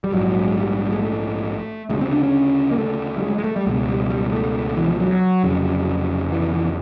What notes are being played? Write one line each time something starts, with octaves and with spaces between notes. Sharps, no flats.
G3
A#1 G#2 F#3
G#3
G3
G#3
A3
D2 C#3 G#3
C4
D4
C#4
A#3
A3
G3
G#3
G#3
A3
G3
C#2 B2 G#3
G3
G3
A3
E3
F3
F#3
F1 F2 C#3
E3
E3